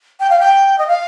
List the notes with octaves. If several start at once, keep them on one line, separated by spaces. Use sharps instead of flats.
G5
F5
G5
D#5
F5